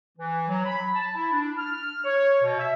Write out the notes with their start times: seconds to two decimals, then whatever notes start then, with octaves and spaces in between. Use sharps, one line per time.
0.18 E3
0.49 F#3
0.65 B5
0.94 A5
1.16 E4
1.33 D4
1.57 F6
2.04 C#5
2.42 B2
2.59 E5